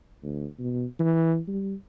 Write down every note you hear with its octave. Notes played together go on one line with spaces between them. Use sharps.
D2
B2
E3
G3